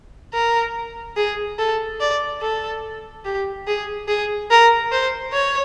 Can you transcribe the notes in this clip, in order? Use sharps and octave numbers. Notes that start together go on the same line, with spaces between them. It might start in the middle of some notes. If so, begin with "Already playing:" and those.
A#4
G#4
A4
D5
A4
G4
G#4
G#4
A#4
C5
C#5